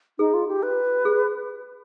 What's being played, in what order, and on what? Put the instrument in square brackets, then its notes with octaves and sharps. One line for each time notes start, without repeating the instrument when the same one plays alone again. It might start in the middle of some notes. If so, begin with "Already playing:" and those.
[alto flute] D#4 [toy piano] G#4
[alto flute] F4
G4
B4
[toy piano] G#4